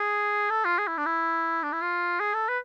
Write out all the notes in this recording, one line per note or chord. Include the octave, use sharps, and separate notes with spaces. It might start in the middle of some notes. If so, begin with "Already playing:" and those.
Already playing: G#4
A4
F4
G#4
E4
D4
E4
D4
E4
F4
G#4
A4
B4